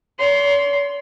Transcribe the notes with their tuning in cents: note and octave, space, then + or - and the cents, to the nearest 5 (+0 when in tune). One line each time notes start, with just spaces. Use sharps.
C#5 +45 C6 +5